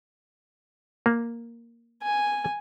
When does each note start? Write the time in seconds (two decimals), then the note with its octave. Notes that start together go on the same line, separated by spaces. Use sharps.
1.06 A#3
2.03 G#5